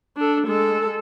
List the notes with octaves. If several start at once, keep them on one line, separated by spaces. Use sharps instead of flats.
D4 A4
G#3 A4